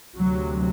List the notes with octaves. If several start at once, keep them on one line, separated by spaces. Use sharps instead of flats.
D2 C3 F#3